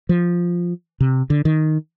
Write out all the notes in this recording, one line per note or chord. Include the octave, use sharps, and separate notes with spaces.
F3
C3
D3
D#3